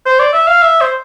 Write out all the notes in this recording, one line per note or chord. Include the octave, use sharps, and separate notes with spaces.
C5
D5
E5
F5
E5
C5